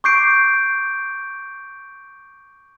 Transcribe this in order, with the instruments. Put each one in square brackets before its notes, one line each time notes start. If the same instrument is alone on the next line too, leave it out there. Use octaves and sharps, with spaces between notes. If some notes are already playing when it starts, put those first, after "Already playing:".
[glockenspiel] C#6 D6 G6 C7 D7